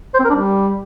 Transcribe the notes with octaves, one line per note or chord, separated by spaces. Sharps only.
C5
C4
A#4
D4
G3